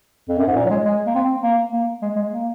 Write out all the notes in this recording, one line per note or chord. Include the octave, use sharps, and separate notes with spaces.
F2
F#2
G#2
A#2
F#3
G#3
G#3
A#3
C4
A#3
A#3
G#3
G#3
A#3